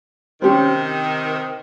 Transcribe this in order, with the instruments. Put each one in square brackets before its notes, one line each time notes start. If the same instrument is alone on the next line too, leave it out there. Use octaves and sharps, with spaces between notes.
[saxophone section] C3 D#3 [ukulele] C#4 G4 C5